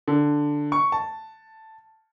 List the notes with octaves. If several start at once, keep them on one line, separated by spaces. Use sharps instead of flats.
D3
C#6
A5